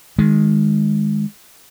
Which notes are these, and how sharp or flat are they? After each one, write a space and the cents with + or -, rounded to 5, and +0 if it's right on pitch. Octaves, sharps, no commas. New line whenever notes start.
D#3 +0 G#3 +0